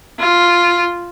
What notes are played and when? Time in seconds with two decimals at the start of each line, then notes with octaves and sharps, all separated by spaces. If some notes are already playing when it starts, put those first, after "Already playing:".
0.20 F4